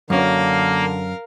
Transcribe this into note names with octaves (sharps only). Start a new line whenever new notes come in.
F#2 D3 A#3 C#4 A#4 F5